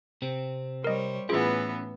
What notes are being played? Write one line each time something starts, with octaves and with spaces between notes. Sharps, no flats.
C3 C4
G3 A#4 C5 C#5 D#5
A2 E3 B3 C#4 F4 G#4